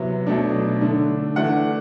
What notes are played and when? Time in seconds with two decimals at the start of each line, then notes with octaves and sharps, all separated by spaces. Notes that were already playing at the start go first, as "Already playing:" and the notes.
Already playing: C3 F#3 B3 E4
0.27 B2 F#3 A3 D4
0.81 D3 A3 D4
1.36 E3 A3 D4 F#5